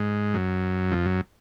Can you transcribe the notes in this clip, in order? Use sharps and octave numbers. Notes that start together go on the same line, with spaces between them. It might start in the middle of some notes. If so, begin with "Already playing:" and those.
Already playing: G#2
F#2
F2
F#2